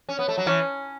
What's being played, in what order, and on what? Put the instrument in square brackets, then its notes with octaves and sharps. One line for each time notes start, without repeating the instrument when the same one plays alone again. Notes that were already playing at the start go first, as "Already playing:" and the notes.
[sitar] C#4
B3
A3
F#3
[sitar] E3 [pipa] C#4